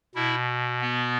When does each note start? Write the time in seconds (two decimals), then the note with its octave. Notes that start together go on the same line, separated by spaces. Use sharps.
0.15 B2 E4
0.81 B3